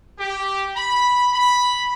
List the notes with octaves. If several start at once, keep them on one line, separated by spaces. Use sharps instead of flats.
G4
B5
B5